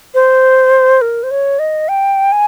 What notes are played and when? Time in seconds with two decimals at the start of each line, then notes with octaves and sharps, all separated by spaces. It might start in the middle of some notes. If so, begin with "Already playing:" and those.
0.14 C5
1.01 A#4
1.23 C5
1.31 C#5
1.59 D#5
1.88 G5
2.32 G#5